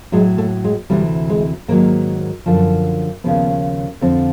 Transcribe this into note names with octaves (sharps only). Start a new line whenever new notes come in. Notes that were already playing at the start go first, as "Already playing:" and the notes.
A2 F#3 G#3
A3
G#3
D2 C3 E3 G3
G#3
G#2 D#3 F#3 A#3
F#2 D3 F3
D#2 C#3 F3 B3
F2 D3 F3 C4